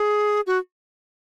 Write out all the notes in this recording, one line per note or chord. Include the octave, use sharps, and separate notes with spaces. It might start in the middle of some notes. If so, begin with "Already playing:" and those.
Already playing: G#4
F#4